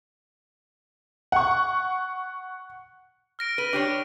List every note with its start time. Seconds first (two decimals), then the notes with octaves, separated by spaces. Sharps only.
1.32 F#5 C#6
3.39 F6 A#6 D7
3.58 B4 D#7
3.73 D4 G4 C#5 D7